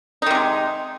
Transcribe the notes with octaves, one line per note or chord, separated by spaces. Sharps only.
C3 D#3 G#3 D#4